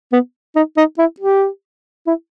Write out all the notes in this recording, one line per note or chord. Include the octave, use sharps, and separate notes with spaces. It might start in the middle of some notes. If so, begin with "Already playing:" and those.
B3
D#4
D#4
E4
G4
E4